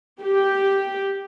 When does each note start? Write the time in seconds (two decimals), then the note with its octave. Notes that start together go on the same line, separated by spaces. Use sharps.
0.22 G4